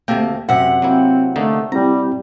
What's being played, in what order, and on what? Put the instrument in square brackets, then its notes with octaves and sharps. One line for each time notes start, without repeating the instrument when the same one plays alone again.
[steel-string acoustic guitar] D2 A#3 [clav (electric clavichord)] C3 A4 G5
[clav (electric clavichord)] F#2 E5 [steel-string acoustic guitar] C3 F#5
[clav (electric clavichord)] F#3 A#3 E4 [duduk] C4
[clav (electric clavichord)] D3 A#3 D#4 [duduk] A3
[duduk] G3 [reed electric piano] C4 E4 G4 [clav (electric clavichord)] A#5